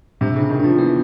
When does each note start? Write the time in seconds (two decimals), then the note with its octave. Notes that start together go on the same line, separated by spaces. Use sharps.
0.21 C3 D4
0.36 C#3
0.40 D4
0.50 D#3
0.59 F3 D4
0.78 E3 B3